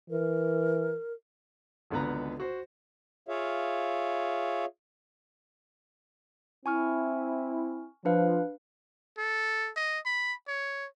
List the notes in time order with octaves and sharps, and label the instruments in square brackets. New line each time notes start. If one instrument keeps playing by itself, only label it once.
[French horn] E3 [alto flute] A#4
[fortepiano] G#1 C#2 D3 B3 B4 A#5
F#4 C5
[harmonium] F4 G#4 C#5 E5 F5
[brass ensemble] C4 E4 [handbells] G#5 C#6 F6
[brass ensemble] F3 [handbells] D4 B4 F5
[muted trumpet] A4
D#5
B5
C#5